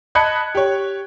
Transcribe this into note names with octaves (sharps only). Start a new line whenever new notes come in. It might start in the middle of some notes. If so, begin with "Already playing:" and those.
D#5 A5 B5 F#6 G#6 C#7
G4 C#5